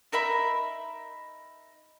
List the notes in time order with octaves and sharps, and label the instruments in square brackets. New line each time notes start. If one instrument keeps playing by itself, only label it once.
[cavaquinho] D#4 A#4 E5 B5